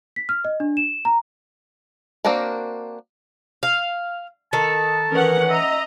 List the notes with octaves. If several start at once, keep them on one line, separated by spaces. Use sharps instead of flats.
B6
F6
D#5
D4
E7
A#5
A#3 C4 D4 F#4 A#4
F5
D#3 A4 A5
E3 C#4 A#4 F#5
D#5 E5 A#5